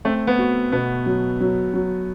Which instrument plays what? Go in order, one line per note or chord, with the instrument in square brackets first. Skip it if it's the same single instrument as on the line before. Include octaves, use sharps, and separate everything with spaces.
[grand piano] A3 [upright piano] C4
[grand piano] B3
[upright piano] F#4
[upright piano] B2 [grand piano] B3
[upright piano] F#3
F#3
F#3